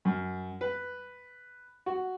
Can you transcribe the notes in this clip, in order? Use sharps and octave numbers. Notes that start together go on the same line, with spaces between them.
F#2
B4
F#4